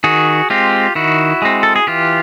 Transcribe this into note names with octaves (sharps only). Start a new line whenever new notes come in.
D#3 F#4 G#4
G#3 C4 F4 G4
D#3 E4 F#4
G#3 C4
A4
G#4
E3 F4 G4